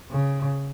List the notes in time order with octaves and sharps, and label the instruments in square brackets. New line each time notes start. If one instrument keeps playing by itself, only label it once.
[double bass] C#3